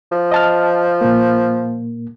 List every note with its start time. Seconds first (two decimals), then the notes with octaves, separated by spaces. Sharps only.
0.12 F3
0.32 D#5 A5 F6
1.01 A#2 A#3